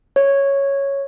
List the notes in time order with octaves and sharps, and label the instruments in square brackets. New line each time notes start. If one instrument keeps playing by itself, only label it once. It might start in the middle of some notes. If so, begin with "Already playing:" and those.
[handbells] C#5